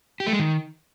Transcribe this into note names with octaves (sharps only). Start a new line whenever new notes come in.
G4
A3
G#3
D#3